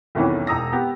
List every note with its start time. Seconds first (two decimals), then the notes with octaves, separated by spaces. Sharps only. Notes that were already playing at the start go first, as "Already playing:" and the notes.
0.15 C2 F2 D#3 E3 B3 C#4
0.47 E1 A#5 D#6 E6 A#6
0.73 B3 G4